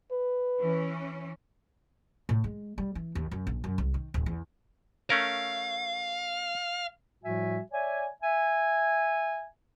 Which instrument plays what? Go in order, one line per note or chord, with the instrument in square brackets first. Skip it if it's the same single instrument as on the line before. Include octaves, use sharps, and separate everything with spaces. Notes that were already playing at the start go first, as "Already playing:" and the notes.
[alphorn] B4
[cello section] E3 C#4
[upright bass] A2
G#3
G3
E3
D#2
F#2
A#1
F#2
C2
D#3
D1
E2
[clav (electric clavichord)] A3 C#4 A#4 [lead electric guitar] F5
[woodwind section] A2 F3 G3 F#4 E5 G#5
C#5 D5 E5 G#5
E5 G#5